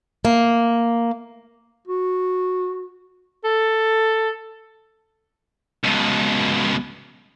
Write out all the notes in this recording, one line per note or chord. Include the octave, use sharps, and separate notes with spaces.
A#3
F#4
A4
C#2 B2